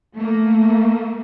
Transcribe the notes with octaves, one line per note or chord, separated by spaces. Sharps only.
A3 A#3